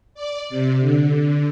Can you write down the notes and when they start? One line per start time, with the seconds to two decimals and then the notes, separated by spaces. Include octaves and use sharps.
0.14 D5
0.49 C3
0.80 D3